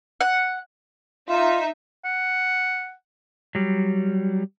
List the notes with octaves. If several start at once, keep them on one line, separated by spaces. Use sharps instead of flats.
F#5
D#4 F4 E5
F#5
F#3 G3